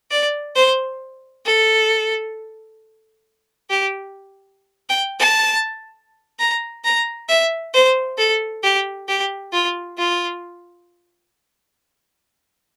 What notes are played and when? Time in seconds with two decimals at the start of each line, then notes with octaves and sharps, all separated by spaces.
0.11 D5
0.55 C5
1.45 A4
3.70 G4
4.89 G5
5.19 A5
6.39 A#5
6.84 A#5
7.29 E5
7.74 C5
8.18 A4
8.63 G4
9.08 G4
9.53 F4
9.98 F4